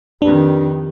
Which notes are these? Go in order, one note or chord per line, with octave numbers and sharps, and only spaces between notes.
F2 D#3 D4 G4 B4